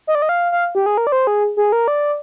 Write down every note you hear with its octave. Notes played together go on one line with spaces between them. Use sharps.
D#5
D5
D#5
F5
F5
G4
G#4
A#4
D5
C5
G#4
G#4
A#4
D5